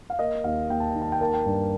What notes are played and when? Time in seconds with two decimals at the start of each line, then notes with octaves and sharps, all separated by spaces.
0.10 F5
0.19 A#3 D#5
0.44 D#2 F5
0.69 D#2 G5
0.80 A5
0.91 D#3 G5
1.02 A5
1.12 G5
1.21 A#3 A5
1.33 G5
1.46 G2